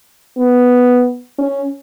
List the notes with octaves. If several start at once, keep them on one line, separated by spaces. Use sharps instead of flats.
B3
C#4